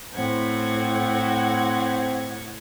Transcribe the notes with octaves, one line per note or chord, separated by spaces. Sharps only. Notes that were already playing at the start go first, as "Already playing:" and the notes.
A2 C4 F#5 G#6